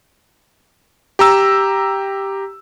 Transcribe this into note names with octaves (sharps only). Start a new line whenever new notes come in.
G4 A#5 E6